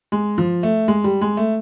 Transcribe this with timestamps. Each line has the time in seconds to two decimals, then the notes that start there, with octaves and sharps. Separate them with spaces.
0.12 G#3
0.38 F3
0.63 A3
0.88 G#3
1.04 G3
1.21 G#3
1.37 A3